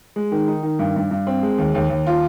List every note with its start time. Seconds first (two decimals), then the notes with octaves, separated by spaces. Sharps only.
0.16 G#3
0.32 D#3
0.48 D#4
0.63 D#3
0.79 G2
0.96 G2
1.11 G2
1.27 C4
1.43 G#3
1.58 D#2
1.75 D#2
1.90 D#2
2.07 F4